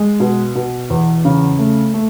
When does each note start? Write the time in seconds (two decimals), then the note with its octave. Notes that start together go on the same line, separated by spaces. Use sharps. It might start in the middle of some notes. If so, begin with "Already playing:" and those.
Already playing: G#3
0.20 B2
0.55 B2
0.90 E2
1.25 C#3
1.59 A3
1.94 A3